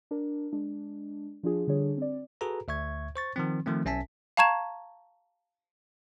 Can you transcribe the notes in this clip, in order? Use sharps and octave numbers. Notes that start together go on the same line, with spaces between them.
D4 A#4
G#3 D4
F3 D4 F4 G#4
D3 G3 D4 G#4 C#5
C4 D5
F#4 G#4 A4 B4 A#5
D2 E5 C#6 G#6
C5 C#6 A6
D#3 F3 C4
D#3 F3 A3 C4
B1 C#4 E5 G#5 A5 B6
F5 A5 A#5 C#6 G#6 E7